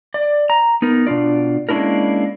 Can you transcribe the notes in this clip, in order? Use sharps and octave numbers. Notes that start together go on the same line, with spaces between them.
D5
A#5
B3 D#4 A#4
B2 D4 F4 D5
G#3 A#3 C#4 D4 E4 A#4